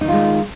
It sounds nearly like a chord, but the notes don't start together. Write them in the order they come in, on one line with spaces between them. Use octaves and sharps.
D#4 D#3 F4 G#3